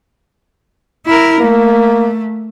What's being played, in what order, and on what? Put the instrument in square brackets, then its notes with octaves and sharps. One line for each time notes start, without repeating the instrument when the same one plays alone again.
[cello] E4 A#4
[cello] A3 [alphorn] A#3